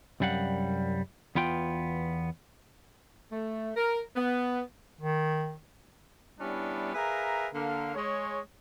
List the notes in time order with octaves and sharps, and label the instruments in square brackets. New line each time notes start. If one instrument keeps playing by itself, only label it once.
[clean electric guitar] C2 F#2 G3 F5 F#5
E2 B3 F4 G5
[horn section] A3
A#4
B3
[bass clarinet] D#3
[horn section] G3 B3 C#4 D4 E4
G#4 A#4 B4 E5 F5 A#5
D3 A#3 F5
G#3 C#5